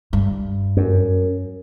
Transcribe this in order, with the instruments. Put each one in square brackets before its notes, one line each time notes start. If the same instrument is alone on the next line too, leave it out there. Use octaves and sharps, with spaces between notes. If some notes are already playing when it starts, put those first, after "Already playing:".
[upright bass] G2
[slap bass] F#2